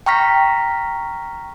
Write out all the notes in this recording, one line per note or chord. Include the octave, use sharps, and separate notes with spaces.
G5 A#5 C#6 F6 A#6 B6